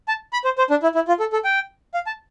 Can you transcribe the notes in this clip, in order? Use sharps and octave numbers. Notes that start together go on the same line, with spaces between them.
A5
B5
C5
C5
D4
E4
E4
F4
A4
A4
G5
F5
A5